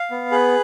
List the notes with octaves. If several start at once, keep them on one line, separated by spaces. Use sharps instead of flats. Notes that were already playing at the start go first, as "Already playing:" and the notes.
Already playing: F5
B3
G#4 B4